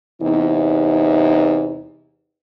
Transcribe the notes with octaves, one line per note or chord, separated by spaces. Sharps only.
E2 C3 D#4